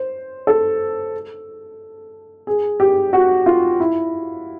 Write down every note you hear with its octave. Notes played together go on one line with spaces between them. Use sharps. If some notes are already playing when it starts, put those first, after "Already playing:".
Already playing: C5
A4
G#4
G4
F#4
F4
E4